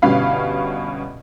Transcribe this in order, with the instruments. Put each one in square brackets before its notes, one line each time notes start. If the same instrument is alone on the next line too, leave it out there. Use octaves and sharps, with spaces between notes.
[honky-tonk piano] G1 G2 B2 C#4 F5 B5